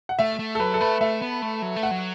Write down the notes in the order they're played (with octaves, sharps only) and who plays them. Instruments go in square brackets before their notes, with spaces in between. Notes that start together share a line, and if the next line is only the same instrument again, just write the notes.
[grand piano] F#5
[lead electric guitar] A3 [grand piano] E5
[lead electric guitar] A3
[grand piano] A4
[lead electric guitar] F#3 [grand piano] B4
[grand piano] A4
[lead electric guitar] A3 [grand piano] B4
[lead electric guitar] A3 [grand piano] E5
[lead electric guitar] B3
A3
F#3
A3
[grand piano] F#5
[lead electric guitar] F#3